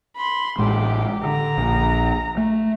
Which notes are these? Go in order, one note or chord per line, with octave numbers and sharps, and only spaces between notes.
B5 C6
A1 A2 G#3 G4
D3 A#5
A#1
A3